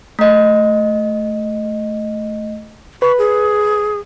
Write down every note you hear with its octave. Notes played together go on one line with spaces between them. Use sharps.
A3 D#5
B4 C#6
G#4